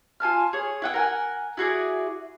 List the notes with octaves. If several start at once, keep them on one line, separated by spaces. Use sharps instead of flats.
F4 G#5 A5 F6
G#4 C#5
E4 F#5 G5
A#4 F#5 G#5
E4 F#4 G#4 D5